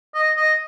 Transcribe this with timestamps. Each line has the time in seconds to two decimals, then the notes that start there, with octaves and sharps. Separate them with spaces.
0.14 D#5
0.37 D#5